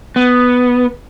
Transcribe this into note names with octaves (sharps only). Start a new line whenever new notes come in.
B3